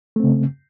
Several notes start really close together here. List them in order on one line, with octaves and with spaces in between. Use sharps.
A3 C4 C#3